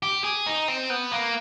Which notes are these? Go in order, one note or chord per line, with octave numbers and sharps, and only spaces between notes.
G4
G#4
D#4
C4
B3
A#3